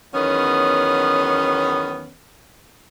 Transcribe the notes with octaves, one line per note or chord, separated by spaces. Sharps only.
E2 D#3 F#3 B3 C#4